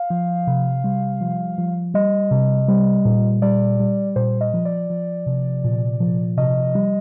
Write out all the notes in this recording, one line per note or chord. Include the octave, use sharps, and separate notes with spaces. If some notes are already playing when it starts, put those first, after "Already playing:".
Already playing: F5
F3
C3
G3
F3
F3
G3 D#5
C3
G3
A#2
G3 D5
G3
A#2 C5
D#5
F3
D5
F3
C3
A#2
F3
C3 D#5
G3